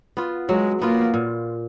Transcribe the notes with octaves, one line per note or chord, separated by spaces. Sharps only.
B3 F4
F#3 G#3
A#3 B3 F4
A#2